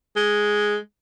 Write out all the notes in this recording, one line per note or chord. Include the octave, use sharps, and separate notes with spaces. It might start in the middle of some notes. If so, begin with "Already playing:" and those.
G#3